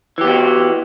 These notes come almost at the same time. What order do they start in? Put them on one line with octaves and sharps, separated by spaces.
E3 G4 B3 F#4